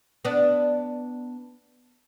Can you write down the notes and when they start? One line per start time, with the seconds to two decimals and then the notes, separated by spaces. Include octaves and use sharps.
0.25 B3 D4